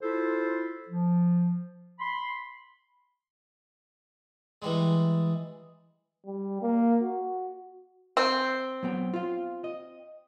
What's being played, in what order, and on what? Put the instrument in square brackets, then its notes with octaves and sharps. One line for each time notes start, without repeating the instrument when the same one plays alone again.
[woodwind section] E4 F4 A4 C5
F3
B5 C6
[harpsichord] E3 G3 G#3
[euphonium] G3
A#3
F#4
[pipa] C4
[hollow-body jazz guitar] F#3 B3 G5
F4 F5
D#5